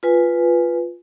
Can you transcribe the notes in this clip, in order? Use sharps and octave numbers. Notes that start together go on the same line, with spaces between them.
F4 B4 G#5